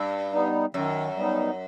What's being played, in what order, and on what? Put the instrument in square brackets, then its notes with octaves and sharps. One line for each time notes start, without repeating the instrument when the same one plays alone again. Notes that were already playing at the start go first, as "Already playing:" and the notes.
Already playing: [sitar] G2
[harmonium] G3 B3 D#4
[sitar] F#2 [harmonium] D#3
[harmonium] G3 B3 D#4